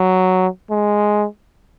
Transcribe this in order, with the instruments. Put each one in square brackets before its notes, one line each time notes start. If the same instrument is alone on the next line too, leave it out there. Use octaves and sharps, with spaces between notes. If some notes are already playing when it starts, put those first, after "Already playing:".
Already playing: [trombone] F#3
G#3